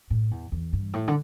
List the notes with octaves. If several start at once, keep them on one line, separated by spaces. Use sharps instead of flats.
A2
E2
E2
G2
A2
D3